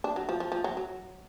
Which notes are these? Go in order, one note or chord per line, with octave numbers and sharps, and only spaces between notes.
D4
F#3
F3
F3
F3
F#3
F#3